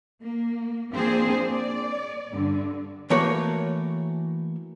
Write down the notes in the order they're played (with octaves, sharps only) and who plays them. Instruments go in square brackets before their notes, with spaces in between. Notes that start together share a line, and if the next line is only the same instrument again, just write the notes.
[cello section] A#3
F3 A#3 C4 D4 G#4 C5
D5
G2 D3
[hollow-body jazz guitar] E3 A3 A#3 F#4 C#5